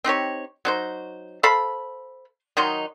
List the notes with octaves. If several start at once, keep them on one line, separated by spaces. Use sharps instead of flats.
C4 D#4 G4 C#5
F#3 D#4 C5
A4 C5 F5 B5
D#3 F#3 D#4 C6